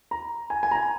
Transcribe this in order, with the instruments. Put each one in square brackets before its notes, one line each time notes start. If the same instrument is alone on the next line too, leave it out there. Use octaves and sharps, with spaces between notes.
[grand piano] A#5
G#5
G#5
A#5
G#5